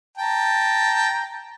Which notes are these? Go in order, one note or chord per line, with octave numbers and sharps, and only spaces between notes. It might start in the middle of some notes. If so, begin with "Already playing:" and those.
G5 A5 A#5